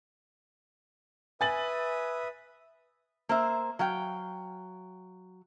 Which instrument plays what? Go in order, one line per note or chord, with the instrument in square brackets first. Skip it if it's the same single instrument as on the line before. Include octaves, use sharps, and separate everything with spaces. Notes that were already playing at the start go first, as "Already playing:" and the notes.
[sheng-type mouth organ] B4 E5 D#6 [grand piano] G#5 A6 F#7
[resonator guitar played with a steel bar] A#3 C5 E5
F#3 F5 G5